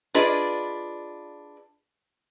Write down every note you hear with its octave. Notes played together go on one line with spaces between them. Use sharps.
D4 F4 G#4 B4 D5 D#5